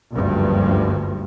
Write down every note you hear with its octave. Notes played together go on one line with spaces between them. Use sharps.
F#1 D2 G2 F3